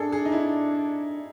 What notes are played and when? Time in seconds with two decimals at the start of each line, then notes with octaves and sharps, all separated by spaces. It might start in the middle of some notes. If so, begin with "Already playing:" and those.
Already playing: D4 G#4 A4
0.12 G#4
0.25 D#4
0.32 E4